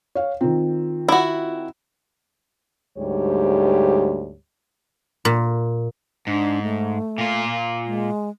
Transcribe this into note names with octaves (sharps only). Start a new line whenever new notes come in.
C#5 F5
D#3 C4 F4
E4 F#4
D2 G#2 G3 G4 C#5
A#2
G#2 D4
A3
A#2 F4
G#3